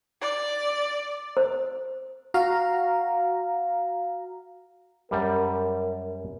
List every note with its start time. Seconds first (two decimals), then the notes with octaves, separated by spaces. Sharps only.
0.21 D5
1.37 C5
2.34 F#4 F5 A#5
5.11 F#2 G3 A#4